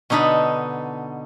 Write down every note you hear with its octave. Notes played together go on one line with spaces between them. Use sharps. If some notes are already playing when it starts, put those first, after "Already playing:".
B2 D3 D#4 A4 B5